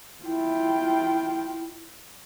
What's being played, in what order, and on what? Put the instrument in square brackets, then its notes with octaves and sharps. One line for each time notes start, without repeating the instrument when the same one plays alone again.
[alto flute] E4 [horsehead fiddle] F4 G5